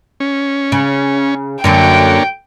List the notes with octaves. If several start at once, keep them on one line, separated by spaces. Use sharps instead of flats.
C#4
C#3
F#2 D3 F#3 A#3 D4 C#5 G5